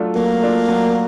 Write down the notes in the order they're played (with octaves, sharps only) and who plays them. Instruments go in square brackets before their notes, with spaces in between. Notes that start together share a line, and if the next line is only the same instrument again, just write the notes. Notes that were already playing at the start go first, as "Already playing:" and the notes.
Already playing: [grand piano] F#3 A3 D4 F4
[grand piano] F#3 [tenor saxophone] A#3
[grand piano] A3 D4 F4
F#3